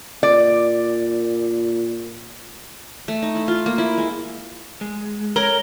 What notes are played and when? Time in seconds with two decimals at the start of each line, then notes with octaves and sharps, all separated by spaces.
0.23 A#2 D5
3.08 A3
3.22 D#4
3.35 E4
3.48 F4
3.66 A#3
3.78 E4
3.98 G#3
4.81 G#3
5.36 A4 A#4 C#5 G7